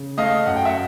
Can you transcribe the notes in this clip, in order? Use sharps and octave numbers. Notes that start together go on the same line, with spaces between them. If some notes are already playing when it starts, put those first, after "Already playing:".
Already playing: C#3
A3 D#5 F5
F#2 F#5
G5
E5 F#5